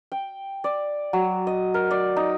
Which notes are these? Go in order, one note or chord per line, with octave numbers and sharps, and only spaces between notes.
G5
D5
F#3
D#5
A#4
D5
D#4